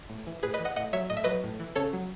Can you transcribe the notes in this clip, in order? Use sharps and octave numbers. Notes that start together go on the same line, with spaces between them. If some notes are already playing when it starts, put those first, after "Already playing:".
A2
E3
A2 G#4 B4
B4 D#5
E3
D#5 F#5
A2 D#5 F#5
F#3 C#5 E5
A2 D#5
E5
F#3 B4 D#5
A2
E3
C#3 A4 C#5
F#3